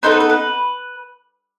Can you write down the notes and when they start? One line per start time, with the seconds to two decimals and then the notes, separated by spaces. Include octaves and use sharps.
0.03 B3 D#4 A4 C5
0.12 B4
0.20 A4
0.29 B4